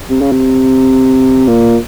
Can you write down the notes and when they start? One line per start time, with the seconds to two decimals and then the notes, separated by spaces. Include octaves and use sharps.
0.10 C3
0.21 C#3
0.32 C3
1.48 A#2